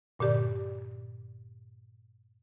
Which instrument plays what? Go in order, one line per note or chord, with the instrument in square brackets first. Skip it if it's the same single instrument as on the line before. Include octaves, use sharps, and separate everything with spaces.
[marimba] G2 A#2 D3 G4 D5